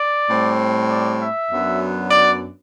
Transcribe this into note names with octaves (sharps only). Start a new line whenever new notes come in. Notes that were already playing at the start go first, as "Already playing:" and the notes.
Already playing: D5
A2 G3 C4
D5
E5
F#2 F#3 B3 D4
D5